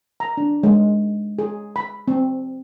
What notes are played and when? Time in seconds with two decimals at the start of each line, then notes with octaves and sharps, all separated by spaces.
0.20 A#5
0.37 D4
0.63 G#3
1.39 G#4
1.76 B5
2.08 C4